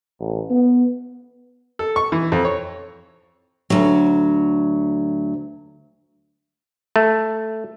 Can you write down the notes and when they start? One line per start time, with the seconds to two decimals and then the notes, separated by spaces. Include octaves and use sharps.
0.20 A1
0.50 B3
1.79 A4
1.96 C#6
2.12 E3
2.32 F2
2.45 C#5
3.70 D2 F#3
6.96 A3